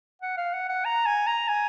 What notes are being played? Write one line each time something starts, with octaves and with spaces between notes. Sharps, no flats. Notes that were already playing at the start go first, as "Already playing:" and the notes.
F#5
F5
F#5
F#5
A#5
G#5
A#5
G#5